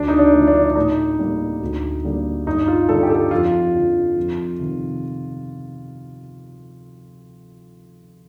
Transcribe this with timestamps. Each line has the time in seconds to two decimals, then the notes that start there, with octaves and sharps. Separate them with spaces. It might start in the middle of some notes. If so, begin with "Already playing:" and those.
Already playing: D2 D4
0.08 D#4
0.19 D4
0.33 D3 F3 A3
0.48 D4
0.70 D4
0.75 A2 D#4
1.19 G3 A#3
1.61 D2
2.04 D3 G3 A#3
2.46 G2 D#4
2.68 F4
2.89 D3 G3 A4
3.03 G4
3.10 A4
3.31 F2 F4
3.75 D3 F3
4.16 F2
4.59 C3 D#3